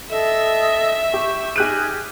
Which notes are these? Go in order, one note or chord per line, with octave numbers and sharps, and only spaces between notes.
A4 D#5 E5
G4 C#6
D#4 G4 G#4 F6 F#6 D#7